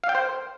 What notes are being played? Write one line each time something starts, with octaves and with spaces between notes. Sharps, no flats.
F5
G5
C5